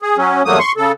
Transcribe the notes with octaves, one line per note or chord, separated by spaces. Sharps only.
G#4
F#3 C#4
E2 G2 F#3 A3 A#3 D#6
C6 C#6
C#3 A4